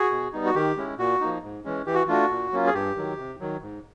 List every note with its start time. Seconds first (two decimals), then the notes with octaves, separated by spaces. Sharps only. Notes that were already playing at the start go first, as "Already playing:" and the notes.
Already playing: F#4 G#4
0.11 B2
0.33 G3 B3 D#4
0.46 F#4
0.55 D#3 G4
0.77 G#3 C#4 E4
0.98 A#2 F#4
1.21 F3 A#3 D#4
1.43 G#2
1.65 E3 G#3 C#4
1.86 E3 G4
1.94 F#4
2.08 A3 D4 F4 F#4
2.30 A#2
2.52 F#3 A#3 C#4 F4
2.67 G#4
2.74 G2 G4
2.96 D#3 F#3
3.18 C3
3.40 D#3 F#3
3.62 G#2